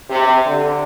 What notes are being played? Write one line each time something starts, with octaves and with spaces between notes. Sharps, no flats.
C3
D3